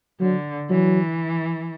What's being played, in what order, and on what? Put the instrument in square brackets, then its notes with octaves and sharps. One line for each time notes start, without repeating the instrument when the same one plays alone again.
[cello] D3 [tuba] F#3
[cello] E3 [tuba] F#3